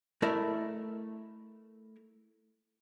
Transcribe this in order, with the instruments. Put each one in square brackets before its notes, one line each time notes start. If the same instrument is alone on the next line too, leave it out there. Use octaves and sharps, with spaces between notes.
[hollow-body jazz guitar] A3 E4 A#4 D5 E5